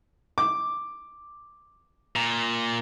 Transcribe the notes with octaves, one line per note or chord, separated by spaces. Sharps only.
D6
A#2